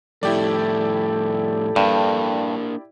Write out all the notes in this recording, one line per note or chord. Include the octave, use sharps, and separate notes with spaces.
F2 A2 E4 G4 A4 D5
G2 A#3 D4